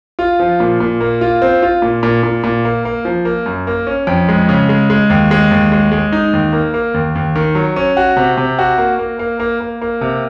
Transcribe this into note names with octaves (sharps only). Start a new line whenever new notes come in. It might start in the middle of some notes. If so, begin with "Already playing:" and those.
F4
F3
A#2
A#2
A#3
F4
C4
F4
A#2
A#2
A#2
A#2
A#3
A#3
F3
A#3
F#2
A#3
C#4
F2
G#3
C#3
G#3
G#3
D#2
G#3
D#2
G#3
G#3
D#4
D#2
A#3
A#3
D#2
D#2
D#3
F#3
C#4
F#4
C3
C3
F#4
A#3
A#3
A#3
A#3
A#3
A#3
C3